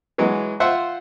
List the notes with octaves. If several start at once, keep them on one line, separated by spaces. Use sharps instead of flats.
E3 F#3 G#3
F4 C5 E5 F#5